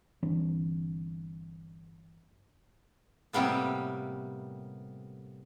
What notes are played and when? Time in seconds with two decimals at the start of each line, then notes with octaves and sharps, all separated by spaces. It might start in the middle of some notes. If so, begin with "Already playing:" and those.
0.22 G1 E3 C4 D4
3.33 A2 C3 G3 A#3 B3